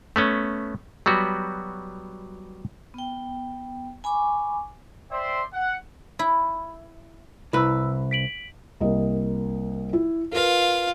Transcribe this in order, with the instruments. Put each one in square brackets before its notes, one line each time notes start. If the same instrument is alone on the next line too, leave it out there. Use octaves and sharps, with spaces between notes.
[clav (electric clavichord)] A3 B3 C#4
F#3 G3 B3 F#4
[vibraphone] B3 G5
G#5 B5 C#6 D6
[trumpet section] C5 D5 E5 G5 C6
F#5
[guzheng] E4
[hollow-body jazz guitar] C2 B4 [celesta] E4 E6
[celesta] B6 D7 F#7
[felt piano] C2 A#3 D#5
E4
[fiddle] F4 F5 [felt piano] A#4 B4